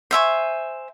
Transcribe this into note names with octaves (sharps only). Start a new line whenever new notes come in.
C5 E5 G#5 C#6